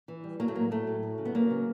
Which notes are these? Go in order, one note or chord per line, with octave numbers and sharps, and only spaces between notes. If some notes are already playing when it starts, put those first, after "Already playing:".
E3
G3
F#3 A#3
A3
A2 A#3
F#3 A3
A2
F#3
C#3
B3
F#3 A#3
C#3